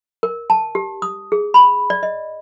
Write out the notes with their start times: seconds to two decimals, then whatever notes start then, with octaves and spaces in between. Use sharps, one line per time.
0.23 A#4
0.50 A5
0.75 G4
1.02 D#6
1.32 G#4
1.54 B5
1.90 D5
2.03 D#5